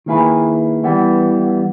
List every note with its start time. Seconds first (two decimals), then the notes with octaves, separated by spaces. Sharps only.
0.06 D#3 A#3 E4 G#4 B4
0.84 E3 G3 B3